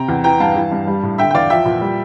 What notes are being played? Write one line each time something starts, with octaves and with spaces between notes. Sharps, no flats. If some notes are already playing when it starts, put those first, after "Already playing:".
Already playing: C3 G5 A#5
E2
E3 G5 A#5
G2 F5 A5
E3
G2
G3
A2
D3 E5 G5
G5
E2 D5 F5
F3 E5 G5
A#2
G3